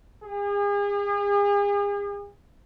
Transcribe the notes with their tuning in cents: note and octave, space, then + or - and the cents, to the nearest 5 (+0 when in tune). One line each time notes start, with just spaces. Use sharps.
G#4 -40